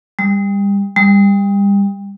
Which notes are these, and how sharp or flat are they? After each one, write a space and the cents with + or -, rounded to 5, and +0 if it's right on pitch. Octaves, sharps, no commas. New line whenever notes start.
G3 +30
G3 +30